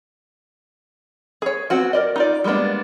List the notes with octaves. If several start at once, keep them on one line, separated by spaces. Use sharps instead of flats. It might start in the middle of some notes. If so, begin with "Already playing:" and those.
G#4 C#5
B3 C4 F#4 G#5
A#4 D5 D#5
D#4 F4 D5
G3 G#3 A#3 B3 D4